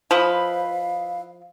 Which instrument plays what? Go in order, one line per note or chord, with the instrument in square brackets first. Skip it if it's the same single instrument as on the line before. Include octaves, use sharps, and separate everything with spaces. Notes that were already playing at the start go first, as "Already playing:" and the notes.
[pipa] F3 [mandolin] E4 B4 D#5 [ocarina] F5